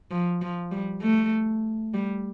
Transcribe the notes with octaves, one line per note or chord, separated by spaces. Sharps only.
F3
F3
G3
A3
G3